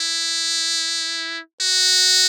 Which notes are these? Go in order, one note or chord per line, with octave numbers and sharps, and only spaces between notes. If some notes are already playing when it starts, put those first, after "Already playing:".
Already playing: E4
F#4